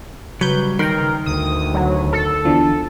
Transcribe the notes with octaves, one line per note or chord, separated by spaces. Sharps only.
C#3 F#3 G3 B4 G6
D#3 A#4 G5 C6
D2 D#6
F#3
A4
E2 D3 F3